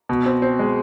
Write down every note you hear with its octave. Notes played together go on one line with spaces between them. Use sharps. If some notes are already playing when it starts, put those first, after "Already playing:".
B2
C4
C4
G#3